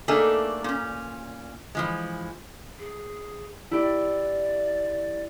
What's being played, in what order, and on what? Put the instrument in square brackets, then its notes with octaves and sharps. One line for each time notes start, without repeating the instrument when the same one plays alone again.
[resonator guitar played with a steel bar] A3 A#3 D4 D#4 G#4 A4
A#2 C#4
E3 F3 G#3
[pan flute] G#4
[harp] E4 G4 [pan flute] D5